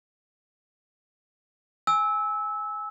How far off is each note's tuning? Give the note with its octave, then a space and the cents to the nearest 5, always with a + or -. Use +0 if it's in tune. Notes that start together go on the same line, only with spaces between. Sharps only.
G#5 +0 E6 -20